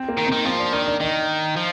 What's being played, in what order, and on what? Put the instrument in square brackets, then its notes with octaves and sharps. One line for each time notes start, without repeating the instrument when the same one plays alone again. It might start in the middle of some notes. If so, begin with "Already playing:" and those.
Already playing: [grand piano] C4
A#3
[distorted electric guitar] D#3
[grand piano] C4
[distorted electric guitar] D#3
[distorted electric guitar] F3 [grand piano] C4
[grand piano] D4
[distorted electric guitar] D#3 [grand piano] D4
[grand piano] D4
[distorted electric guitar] D#3 [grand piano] D#4
[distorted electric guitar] F3